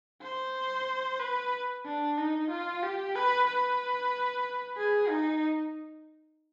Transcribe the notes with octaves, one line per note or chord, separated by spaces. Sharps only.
C5
B4
D4
D#4
F4
G4
B4
B4
G#4
D#4